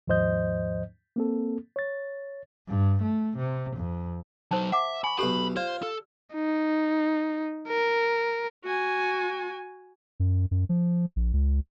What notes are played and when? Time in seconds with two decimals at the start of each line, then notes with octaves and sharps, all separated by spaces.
0.08 D#2 G#2 F3 C5 D#5 G6
1.16 A#3 C4 A4
1.76 C#5 A6
2.68 G2
3.03 A3
3.38 C3
3.77 F2
4.51 F#3 D#4 C5 A5
4.72 E5 F#5 D6
5.04 G#5 B5 C#6
5.19 B1 G4 A4 B4 C5 B5
5.56 F4 C5 D5
5.83 A4
6.34 D#4
7.68 A#4
8.64 F#4 G#5
10.20 F#2
10.51 F#2
10.69 F3
11.16 A#1
11.33 C#2